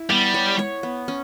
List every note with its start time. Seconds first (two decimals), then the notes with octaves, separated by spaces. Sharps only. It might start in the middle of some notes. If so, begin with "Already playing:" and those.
Already playing: E4
0.10 G3 B3
0.34 C#5
0.59 C#5
0.83 B3
1.08 C#4